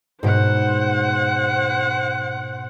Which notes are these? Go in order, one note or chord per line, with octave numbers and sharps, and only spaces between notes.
G#2 B2 C5 F#5